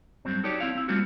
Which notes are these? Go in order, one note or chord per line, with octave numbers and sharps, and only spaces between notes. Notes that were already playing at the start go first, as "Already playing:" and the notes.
G2 F#3 C4
D#4 F#4 G4 A4 C#5 D5
C4 E4 F5
C4 E4
G3 A3 A#3 C4 F4 F#4